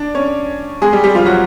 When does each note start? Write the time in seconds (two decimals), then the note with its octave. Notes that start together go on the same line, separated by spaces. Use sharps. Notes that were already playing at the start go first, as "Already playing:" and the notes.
Already playing: D4 D5
0.15 C#4 C#5
0.82 G#3 G#4
0.93 G3 G4
1.04 G3 G4
1.15 F3 F4
1.26 F#3 F#4